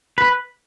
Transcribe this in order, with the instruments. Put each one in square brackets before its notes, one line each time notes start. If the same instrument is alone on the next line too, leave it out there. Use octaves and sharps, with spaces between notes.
[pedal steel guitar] B4